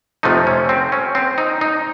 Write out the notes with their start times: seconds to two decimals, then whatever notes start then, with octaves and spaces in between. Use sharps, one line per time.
0.23 F2 C3 F3 A3 D#4
0.47 C#4
0.69 C4
0.92 C#4
1.15 C4
1.38 D#4
1.61 D#4